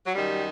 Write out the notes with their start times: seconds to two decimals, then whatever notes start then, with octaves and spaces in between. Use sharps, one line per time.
0.06 F#3
0.14 F#2 D#3 G3